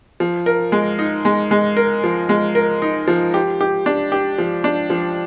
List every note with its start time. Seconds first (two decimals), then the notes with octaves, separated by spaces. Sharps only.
0.20 F3
0.46 A#4
0.72 G#3
0.99 D#4
1.25 G#3
1.51 G#3
1.77 A#4
2.04 F3
2.29 G#3
2.55 A#4
2.82 D#4
3.07 F3
3.34 G4
3.61 G4
3.86 D4
4.12 G4
4.38 F3
4.64 D4
4.90 F3